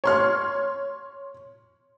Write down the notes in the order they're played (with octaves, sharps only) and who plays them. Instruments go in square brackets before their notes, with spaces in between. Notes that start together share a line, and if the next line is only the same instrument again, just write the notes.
[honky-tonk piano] C#5 C6 F6